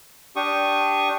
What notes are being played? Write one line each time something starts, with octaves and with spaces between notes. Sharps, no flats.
D4 G4 C#6 D#6